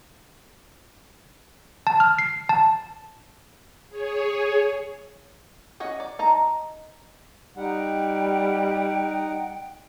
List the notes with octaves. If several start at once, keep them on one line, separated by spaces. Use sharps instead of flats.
A5
F6
C7
A5
G#4 C#5
C#4 C#5 D#5 F#5
D5
D#4 A5 A#5
G3 D#4 F#5 G5